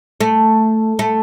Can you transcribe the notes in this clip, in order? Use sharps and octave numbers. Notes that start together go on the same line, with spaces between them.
A3
A3